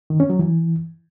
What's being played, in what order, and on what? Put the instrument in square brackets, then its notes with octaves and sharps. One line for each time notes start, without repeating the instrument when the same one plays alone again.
[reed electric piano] D#3
C#4
F#3
E3